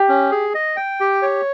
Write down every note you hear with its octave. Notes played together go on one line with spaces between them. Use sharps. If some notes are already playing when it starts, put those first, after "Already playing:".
Already playing: G4
C#4
G#4
D#5
G5
G4
C#5